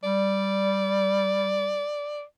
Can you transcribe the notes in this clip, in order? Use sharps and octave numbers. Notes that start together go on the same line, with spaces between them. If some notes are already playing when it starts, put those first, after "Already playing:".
G3 D5